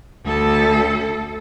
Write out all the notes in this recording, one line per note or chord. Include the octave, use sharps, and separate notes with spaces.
D2 A4